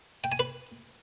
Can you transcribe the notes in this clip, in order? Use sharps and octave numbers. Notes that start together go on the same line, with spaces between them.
G5
G#5
B4